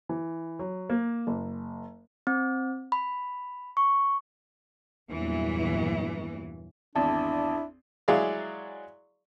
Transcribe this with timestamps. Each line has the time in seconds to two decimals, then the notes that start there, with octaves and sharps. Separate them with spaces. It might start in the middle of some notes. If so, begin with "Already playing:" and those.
0.09 E3
0.59 F#3
0.90 A#3
1.27 F#1
2.27 C4
2.92 B5
3.77 C#6
5.11 E2 G2 A#2 E3 F#3
6.96 G#1 E2 D4 E4 A5
8.08 F#3 G#3 E4 G#4 D5 F5